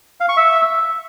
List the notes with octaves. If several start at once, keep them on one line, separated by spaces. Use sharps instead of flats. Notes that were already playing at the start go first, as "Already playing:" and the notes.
F5
C#6
E5